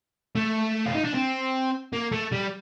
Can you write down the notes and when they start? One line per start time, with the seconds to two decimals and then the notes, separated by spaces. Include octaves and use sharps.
0.36 A3
0.86 F4
0.95 D#4
1.05 D4
1.15 C4
1.93 A#3
2.12 A3
2.32 G3